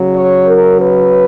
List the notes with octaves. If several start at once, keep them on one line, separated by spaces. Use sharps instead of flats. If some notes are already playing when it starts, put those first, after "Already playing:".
Already playing: C#3 F#3
C#5
A#4
B4